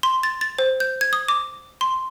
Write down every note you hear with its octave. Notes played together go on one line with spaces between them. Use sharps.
C6
A6
A6
C5
G6
G#6
D#6
D6
C6